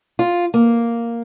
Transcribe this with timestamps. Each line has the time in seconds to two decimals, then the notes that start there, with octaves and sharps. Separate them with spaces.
0.19 F4
0.54 A#3